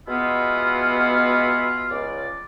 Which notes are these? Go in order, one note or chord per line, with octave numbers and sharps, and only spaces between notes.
B2 G#3 B3 E4 F4
C#2 D5